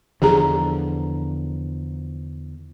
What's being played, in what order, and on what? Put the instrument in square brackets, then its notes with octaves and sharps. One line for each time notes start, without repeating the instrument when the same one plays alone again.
[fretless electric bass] E2 D3 F3 [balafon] G4 G#4 A#5